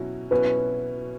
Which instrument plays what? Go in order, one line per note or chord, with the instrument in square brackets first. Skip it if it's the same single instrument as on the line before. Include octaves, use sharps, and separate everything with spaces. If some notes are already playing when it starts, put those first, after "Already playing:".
Already playing: [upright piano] B2 F#3 C#4 E4
[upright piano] B2 F#3 C#4 E4 [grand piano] B4